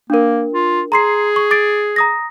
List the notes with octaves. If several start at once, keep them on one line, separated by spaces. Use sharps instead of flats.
A#3 D4 A#4
F4
G#4 A#5 C6 C7
C#6
D6 A6 D7
A#5 D#6 A#6